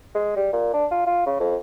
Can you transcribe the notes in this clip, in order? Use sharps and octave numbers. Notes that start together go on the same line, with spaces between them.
G#3
G3
A#2
D4
F4
F4
C#3
F2